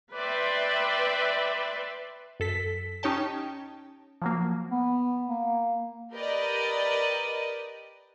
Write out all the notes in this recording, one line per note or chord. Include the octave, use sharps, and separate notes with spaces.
B4 D5 E5 G5 C6
F#2 A4 B6
C#4 D#4 G4 C#5 G5 A5
F3 F#3 A#3
B3
A#3
G4 A#4 B4 D5 D#5